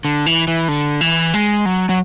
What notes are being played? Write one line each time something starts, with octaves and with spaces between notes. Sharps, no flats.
D3
E3
E3
D3
E3
G#3
F#3
F#3